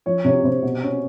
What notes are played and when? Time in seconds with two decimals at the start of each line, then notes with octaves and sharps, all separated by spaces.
0.06 F3 C#5
0.25 C3 C#5
0.44 C3 C5
0.63 B2
0.83 C#4